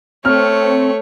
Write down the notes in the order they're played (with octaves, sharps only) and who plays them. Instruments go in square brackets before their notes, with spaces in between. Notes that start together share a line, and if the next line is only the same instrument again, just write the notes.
[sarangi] A3 [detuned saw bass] C4 [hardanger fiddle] C#5 [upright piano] F6